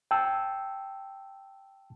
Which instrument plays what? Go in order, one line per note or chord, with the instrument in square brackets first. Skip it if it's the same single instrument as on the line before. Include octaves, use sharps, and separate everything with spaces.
[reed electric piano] G5 A5 E6